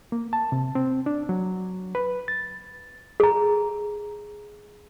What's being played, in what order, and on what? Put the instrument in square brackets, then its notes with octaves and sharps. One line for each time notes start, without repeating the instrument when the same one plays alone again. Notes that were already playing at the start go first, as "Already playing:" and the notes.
[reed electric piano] A#3
A5
C3
C4
D4
F#3
B4
A6
[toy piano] G#4 A#5